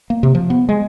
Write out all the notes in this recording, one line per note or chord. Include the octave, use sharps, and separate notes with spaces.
A#3
C3
F3
B3
G#3